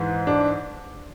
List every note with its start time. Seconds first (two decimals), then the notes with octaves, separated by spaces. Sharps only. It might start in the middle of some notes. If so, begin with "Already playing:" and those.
Already playing: G#2 E3
0.27 D4